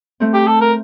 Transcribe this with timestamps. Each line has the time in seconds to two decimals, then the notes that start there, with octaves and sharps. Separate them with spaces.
0.20 A3 C4
0.34 G4
0.47 A4
0.61 A#4